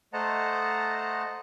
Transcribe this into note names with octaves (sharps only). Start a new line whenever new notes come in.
A3 C5 D#5 F#5 A5 A#5